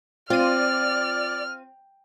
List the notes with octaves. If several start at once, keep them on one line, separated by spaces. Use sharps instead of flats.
C4 F4 D5 F6 D#7